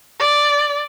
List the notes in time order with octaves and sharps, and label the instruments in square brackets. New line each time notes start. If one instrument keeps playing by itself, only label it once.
[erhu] D5